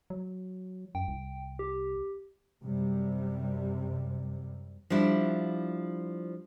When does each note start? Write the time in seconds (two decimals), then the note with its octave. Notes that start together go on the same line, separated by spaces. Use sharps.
0.10 F#3
0.95 F#2 G5
1.08 C2
1.59 G4
2.61 F#2 C3 G3
4.90 F3 G3 D4 E4